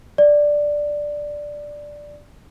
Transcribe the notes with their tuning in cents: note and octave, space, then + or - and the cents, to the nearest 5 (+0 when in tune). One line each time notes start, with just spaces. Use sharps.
D5 +0